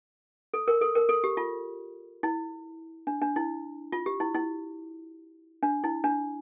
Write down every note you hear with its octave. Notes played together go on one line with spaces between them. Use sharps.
A4
A#4
A4
A#4
A4
G4
F4
E4
D4
D4
E4
F4
G4
E4
E4
D4
E4
D4